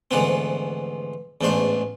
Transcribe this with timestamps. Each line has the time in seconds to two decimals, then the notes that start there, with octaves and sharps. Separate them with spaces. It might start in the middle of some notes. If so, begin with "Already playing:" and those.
0.11 D2 G#2 E3 F3 B3 C4
1.41 A1 E2 G#2 A3 D4 C5